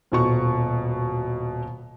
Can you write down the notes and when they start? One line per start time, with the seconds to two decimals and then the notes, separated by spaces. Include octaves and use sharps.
0.12 D#1 B2 C#6